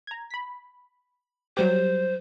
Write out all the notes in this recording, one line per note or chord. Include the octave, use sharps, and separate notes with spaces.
A#5 G#6
B5 B6
F#3 G3 G4 C5